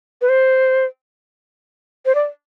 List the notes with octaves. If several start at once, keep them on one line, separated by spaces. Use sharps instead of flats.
B4
C5
C5
D5